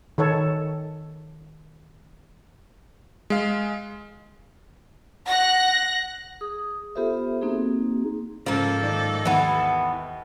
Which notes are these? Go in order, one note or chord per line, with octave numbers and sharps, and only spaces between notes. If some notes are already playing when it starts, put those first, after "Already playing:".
D#3 A4 C#5
G#3 F5
F#5 F#6 A#6
G#4 D#6
B3 F4 G4 A4 C5 E5
A#3 C4 D#4 F#4 G#4
G#2 C#3 F3 A#3 A4
D#3 D5
D#2 E3 B3